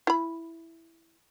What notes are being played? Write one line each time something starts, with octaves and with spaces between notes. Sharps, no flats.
E4 B5